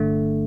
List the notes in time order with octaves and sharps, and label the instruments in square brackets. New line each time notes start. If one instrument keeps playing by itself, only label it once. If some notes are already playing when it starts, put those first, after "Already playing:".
Already playing: [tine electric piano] G1 D3 A3